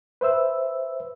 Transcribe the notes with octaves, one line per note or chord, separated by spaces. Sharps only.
B4 C5 E5 E6